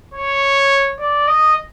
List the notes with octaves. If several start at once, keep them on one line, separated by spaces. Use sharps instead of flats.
C#5
D5
D#5